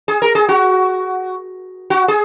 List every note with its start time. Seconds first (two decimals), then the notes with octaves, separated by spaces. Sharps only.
0.08 G#4
0.22 A#4
0.35 G#4
0.49 F#4
1.90 F#4
2.08 G#4